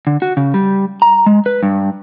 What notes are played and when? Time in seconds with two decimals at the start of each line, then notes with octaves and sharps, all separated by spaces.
0.07 D3
0.22 F#4
0.37 C#3
0.54 G3
1.02 A#5
1.26 G#3
1.46 B4
1.63 G2